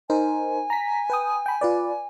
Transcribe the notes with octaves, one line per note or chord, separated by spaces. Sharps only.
D#4 A#4 C5 G#5
A#5 B6
B4 G5 D#6
G5 B5
F4 B4 D5